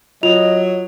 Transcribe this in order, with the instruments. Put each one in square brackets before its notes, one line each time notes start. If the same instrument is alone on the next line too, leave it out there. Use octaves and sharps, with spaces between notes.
[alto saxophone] F#3 [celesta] F4 F7 [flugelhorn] D#5